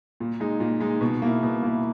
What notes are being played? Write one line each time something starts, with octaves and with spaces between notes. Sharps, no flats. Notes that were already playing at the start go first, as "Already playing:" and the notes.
A#2
G#3 D#4
A#2
G#3 D#4
B2
A#3 E4
B2
A#3 E4